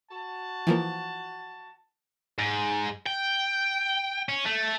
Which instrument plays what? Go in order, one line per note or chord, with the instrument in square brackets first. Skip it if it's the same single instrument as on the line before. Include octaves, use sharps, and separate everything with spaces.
[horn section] F#4 A5
[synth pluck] E3 F3 A#3
[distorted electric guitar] G#2
G5
C#4
A3